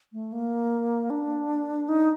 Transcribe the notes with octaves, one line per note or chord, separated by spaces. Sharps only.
A3
A#3
D4
D#4